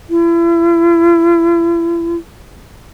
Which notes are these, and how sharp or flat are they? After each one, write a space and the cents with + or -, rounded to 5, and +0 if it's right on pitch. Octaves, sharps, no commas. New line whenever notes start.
E4 +40